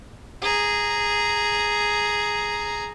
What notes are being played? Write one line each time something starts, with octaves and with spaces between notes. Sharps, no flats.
G#4 A#5